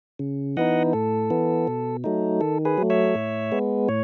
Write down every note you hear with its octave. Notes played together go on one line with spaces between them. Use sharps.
C#3
E3 B3 D#4 D#5 F#5
A2 A4
E3 B3
B2
F#3 A3 D#4
D#3 A4
G#4 B4
F#3 A3
C#5 E5
A2
G#3 B3
A2 C#5